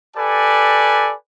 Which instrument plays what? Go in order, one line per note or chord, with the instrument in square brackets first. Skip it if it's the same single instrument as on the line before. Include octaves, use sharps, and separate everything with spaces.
[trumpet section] G4 A4 B4 D5 G#5